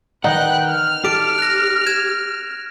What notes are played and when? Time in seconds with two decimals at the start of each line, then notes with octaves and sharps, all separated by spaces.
0.24 D#3 D#4 B4 F#5 G5 F#6
0.67 F6
1.04 G4 A4 D7
1.38 F#6 A#6
1.86 G#6 E7